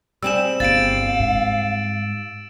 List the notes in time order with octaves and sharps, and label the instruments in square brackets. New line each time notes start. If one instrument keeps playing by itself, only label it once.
[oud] G3 C4 G#4 [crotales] E6 E7
[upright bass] G1 [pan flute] F5 [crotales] A6 D7
[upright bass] G#2